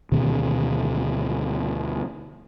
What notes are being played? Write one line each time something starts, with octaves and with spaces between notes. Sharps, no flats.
D2 B2 D#3 C4